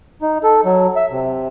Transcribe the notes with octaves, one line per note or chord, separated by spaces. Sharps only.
D#4
A4
F#3
E5
C3